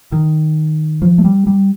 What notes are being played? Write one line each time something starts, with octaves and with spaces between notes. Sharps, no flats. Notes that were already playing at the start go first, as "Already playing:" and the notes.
D#3
F3
A3
G3
G3